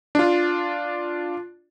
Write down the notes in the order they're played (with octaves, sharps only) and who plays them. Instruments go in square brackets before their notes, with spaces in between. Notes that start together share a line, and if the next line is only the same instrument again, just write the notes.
[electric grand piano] D4 F4